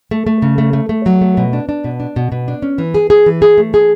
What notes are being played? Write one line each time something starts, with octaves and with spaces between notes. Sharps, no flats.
A3
A3
C#3
A3
A3
A3
F#3
A3
B2
D4
D4
B2
D4
B2
B2
D4
C#4
E3
G#4
G#4
E3
G#4
A3
G#4